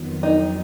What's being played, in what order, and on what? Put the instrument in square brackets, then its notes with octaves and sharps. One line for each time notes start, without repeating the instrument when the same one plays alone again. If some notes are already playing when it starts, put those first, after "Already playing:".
Already playing: [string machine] F2 D#3 F#3 B3 F4
[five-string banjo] D#4